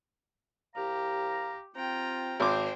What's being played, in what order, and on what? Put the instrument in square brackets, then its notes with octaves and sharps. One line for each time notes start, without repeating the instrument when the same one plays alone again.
[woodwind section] C2 F5 A#5 [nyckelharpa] G4
[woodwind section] C4 F4 [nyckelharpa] G5 A#5
[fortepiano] G#1 D6 [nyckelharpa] C5 G5